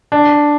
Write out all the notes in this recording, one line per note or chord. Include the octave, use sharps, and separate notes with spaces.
D4